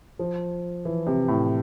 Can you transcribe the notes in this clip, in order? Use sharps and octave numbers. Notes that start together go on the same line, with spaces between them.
F3
E3
C3
A2